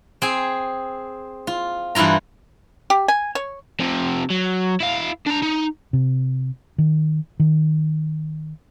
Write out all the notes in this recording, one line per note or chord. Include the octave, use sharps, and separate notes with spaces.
C4 G#4 G#5
F4
G2 E3 E4 F4 A#5
G4
G#5
C#5
C3 F3
F#3
E4 F5
D4 A#5
D#4
C3
D#3
D#3